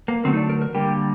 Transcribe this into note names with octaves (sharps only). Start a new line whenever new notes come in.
A#3
D3 F#3 A3 C4
D#4
D4
A#4
A#4
D3 G3 A#3 G4